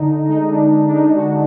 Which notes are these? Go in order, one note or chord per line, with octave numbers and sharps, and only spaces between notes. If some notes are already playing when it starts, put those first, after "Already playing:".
Already playing: D3 D#4
G#3 D#4
D4
D3 D#4
D4
D#4
G#3 F#4